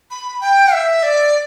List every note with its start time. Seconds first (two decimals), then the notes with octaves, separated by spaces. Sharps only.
0.11 B5
0.41 G5
0.73 E5
1.03 D5